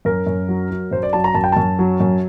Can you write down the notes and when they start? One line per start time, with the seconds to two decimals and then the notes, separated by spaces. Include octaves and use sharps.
0.05 F#2 A#4
0.27 F#2
0.49 F#3
0.71 F#3
0.91 F#2 C5
1.03 D5
1.13 F#3 A5
1.24 A#5
1.35 F#2 A5
1.44 G5
1.52 F#2 A5
1.79 F#3
2.00 F#2